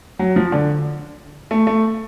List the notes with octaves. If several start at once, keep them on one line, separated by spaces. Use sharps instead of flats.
F#3
F3
D3
A3
A3